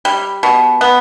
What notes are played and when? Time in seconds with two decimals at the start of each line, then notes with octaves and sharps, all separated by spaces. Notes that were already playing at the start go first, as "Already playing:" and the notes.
0.05 G3
0.43 B2
0.81 B3